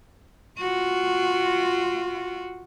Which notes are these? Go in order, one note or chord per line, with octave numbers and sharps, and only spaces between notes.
F4 F#4